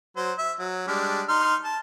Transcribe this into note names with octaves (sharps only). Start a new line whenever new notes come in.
F#3 C5
E5
F#3
G3 G#3 D4
D#4 C6 F6
A5